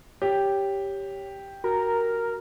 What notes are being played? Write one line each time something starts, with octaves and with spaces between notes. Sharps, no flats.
G4 C#5
F#4 A#4